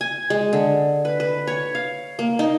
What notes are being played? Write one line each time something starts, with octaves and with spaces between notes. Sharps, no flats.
G#5
G#3
D3
B4
B4
C#5
F5
A#3
D#4